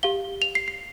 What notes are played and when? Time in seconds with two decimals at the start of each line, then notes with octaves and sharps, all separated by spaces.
0.03 G4 F5 G7
0.42 F7
0.55 C7
0.68 C7